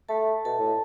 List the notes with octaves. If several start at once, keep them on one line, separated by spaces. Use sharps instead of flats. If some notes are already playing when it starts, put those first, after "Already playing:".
A3 A4 A5
B2 A4 A5
A2